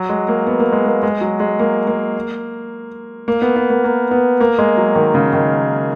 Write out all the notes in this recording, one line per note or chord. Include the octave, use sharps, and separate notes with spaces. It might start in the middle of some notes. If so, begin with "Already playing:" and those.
Already playing: F#3
G#3
A#3
B3
A#3
G#3
A#3
G#3
F#3
G#3
A#3
A#3
A#3
B3
B3
A#3
A#3
B3
A#3
G#3
F#3
D#3
C#3
D#3